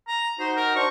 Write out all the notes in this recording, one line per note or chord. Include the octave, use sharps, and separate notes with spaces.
A#5
D#4 F#4 C5
A#4
D4 C5 C#6